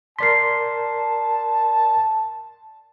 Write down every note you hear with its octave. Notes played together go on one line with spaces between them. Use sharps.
A#4 D5 A5 C6 B6 C7